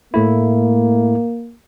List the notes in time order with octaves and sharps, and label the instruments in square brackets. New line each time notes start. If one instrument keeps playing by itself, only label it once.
[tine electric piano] A2 A3 E4 [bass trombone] A#3